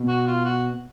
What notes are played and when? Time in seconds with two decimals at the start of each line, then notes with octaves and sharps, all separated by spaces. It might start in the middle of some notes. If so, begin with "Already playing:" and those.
Already playing: B2
0.08 F#4
0.27 F4
0.45 F#4